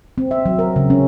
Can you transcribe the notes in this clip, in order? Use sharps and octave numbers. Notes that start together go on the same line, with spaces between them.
C4
E5
F#3
A#4
C#3
C#4